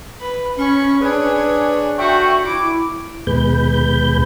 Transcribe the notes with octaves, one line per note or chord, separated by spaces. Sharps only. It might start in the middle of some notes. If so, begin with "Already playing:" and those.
B4
C#4 B5 C#6
D4 G#4 B4 C#5 G#5
F#4 A4 E5 G5 C#6
E4 D6
D#2 B2 G#3 B4 G6